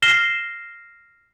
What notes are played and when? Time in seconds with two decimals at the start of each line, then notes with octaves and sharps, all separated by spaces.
0.02 F6 A#6 C7 E7 G7